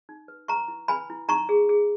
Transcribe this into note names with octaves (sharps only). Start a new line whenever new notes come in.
D#4
B4
B4 A#5 C#6
E4
B4 G#5 B5
E4
D#4 A#5 C#6
G#4
G#4